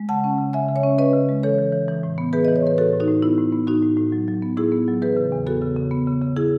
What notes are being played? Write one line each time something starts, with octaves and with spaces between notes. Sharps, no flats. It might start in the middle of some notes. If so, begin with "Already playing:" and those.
Already playing: G#3
C#3 F#5 A5
C#4
C#3
C#3 E5 G#5
C#3
C#5 E5
C#4
C#4 B4 D#5
C#3
G#3
E3 A4 C#5
E3
E3
E3
A2
B3
E3 G#4 B4
E3 D#5
C#5
A2 B4
A2 F#4 A4
A2
D#4 F#4
A2
B3 E4
A2
B3
A2 D#4 F#4
A2
A2
F#3
F#3
B3
A2 E4 G#4
B3
F#3
E3 G#4 B4
C#3
E2
B3 F#4 A4
C#3
C#3
B3
C#3
C#3
C#3 E4 G#4